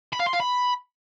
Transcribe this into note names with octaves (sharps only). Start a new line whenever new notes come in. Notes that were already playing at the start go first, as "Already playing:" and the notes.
B5
F5
C6
F5
B5